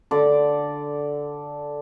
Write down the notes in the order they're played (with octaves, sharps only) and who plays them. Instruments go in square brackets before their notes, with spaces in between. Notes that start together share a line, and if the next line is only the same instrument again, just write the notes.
[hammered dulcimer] D3 D5